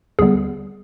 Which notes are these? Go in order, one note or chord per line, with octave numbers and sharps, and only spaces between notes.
D#2 D3 G3 B3 G#4